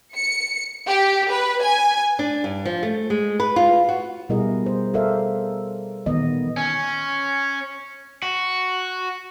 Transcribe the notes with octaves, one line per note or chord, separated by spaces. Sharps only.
C#7
G4
B4
G#5
D4
G2
F3
A3
G#3
B4
F4
F#4
B2 G3 E4 G#4 A#4 D#5
C5
A4 A#4 C5 D5 E5 F5
A#2 D#3 E3 B3 D#5
C#4
F#4